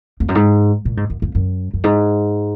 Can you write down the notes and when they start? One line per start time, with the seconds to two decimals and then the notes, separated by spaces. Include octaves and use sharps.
0.20 F2
0.28 F#2
0.35 G#2
0.85 A#2
0.97 G#2
1.10 F#2
1.22 F2
1.35 F#2
1.74 F#2
1.84 G#2